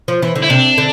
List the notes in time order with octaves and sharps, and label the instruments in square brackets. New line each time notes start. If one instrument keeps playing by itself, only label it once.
[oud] F3
E3
D3
[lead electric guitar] E4
[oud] C3 [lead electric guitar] D4
[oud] D3